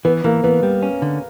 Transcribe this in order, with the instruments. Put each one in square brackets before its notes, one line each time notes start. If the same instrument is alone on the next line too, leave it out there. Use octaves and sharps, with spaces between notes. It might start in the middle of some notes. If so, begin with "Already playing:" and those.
[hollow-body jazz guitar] E3 [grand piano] B3
[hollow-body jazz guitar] E3 [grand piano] A#3
[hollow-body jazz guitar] E3 [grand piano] B3
[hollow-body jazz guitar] G3
C#4
D3